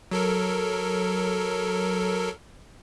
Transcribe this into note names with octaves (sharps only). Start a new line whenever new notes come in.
F#3 A4 A#4